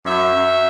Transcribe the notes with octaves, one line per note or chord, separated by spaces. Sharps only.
F#2 E5
F#2